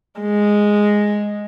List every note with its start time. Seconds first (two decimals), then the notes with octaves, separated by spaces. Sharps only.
0.20 G#3